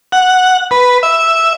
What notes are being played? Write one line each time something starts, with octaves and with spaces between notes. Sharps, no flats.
F#5
B4
E5